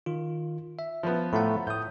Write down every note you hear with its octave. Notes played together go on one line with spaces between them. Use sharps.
D#3 F4
E5
F3 B3
A2 A3 F4 F#5 A#5 B5
A2 D#6 G6